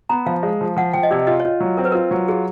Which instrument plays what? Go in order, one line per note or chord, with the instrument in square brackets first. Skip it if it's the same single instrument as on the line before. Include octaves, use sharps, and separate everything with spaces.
[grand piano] B3 [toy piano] A#5
[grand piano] F3 [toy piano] F5
[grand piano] G#3
F3
[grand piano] F3 [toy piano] F#5
[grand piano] F3 [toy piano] G5
[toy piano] D#5
[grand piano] C3 [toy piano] D5
[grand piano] F4 [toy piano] D#5
[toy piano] C#5
[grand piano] F4
F#3
[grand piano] C4 [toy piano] A#4
[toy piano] B4
[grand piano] F4 [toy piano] A#4
[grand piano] F#3
[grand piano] F4 [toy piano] G#4